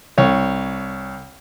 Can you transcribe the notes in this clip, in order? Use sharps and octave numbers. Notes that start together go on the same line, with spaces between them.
C2 C#5